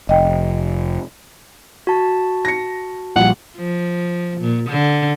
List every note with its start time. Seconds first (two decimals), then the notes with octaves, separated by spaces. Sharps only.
0.09 F1 D#5 G5
1.87 F#4 A5
2.45 A#6 C#7
3.16 A#1 F3 G3 F#5
3.56 F3
4.41 A#2
4.70 D3